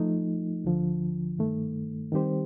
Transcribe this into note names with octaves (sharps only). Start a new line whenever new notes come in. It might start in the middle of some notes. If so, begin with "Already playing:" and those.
Already playing: F3 A3 D#4
D2 D3 F3
G2 D#3 A3
D#3 G3 C4 G4 C5